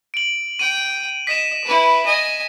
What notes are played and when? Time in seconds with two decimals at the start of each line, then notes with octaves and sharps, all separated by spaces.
0.14 D7 F#7
0.59 G5 D#7
1.27 D#5 B6 E7
1.64 E4 B4
2.06 D#5 G#5